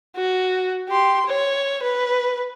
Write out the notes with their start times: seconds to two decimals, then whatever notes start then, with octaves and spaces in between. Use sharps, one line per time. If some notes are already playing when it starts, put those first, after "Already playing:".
0.16 F#4
0.89 G4 C6
1.26 C#5
1.83 B4